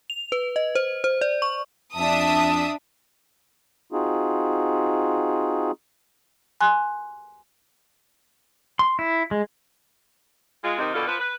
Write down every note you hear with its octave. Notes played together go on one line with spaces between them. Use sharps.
F7
B4
D#5
C5
C5
D5
C#6
F2 D4 E5 A5 D#6
C4 D#4 F4 F#4 G#4
G#5 C6 F#6
C6
E4
G#3
G#3 F4
C3 D#3 D#4
B2 D3 D#3 F4 A4
F3 B4
B4